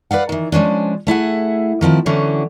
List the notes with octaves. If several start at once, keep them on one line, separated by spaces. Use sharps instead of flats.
B4 D5 F5 F#5
D#3 E3
F3 G#3 C#4 D4
A3 E4 G#4 F#5
D#3 F3 C4 E4
D3 E3 F#3 C#4